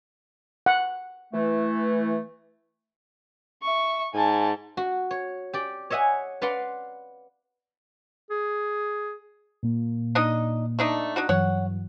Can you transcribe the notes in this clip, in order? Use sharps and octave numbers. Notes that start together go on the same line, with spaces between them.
F#5
E3 A3
E5 C#6
G#2 G#5 A5
F#4
C#5
G4 D5
C#5 D#5 E5 F#5 G#5
B4 D5 F5 F#5 C6
G#4
A#2 A#3
D4 D#4 D#5
A3 D4 D#4
D4 D#4 F#4
G2 E3 F#3 C#5 F#5